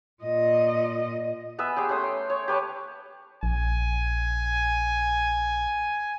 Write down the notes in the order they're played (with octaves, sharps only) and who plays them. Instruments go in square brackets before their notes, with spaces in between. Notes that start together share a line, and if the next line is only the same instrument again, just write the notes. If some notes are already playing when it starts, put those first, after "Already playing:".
[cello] A#2 D#5
[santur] B3 B4 E5 G#5
G4 G#4 G5 C6
A3 C#4 C6 D#6
C6
C#5
G4 B4 C#5 A5
[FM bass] A#1 [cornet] G#5